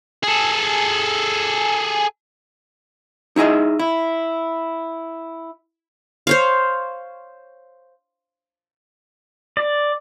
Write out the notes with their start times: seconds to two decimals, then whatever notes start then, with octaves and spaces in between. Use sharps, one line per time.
0.23 G#4 A4
3.36 D#4 E4 G#4 D#5 E5
3.79 E4
6.27 C5 C#5 F5
9.57 D5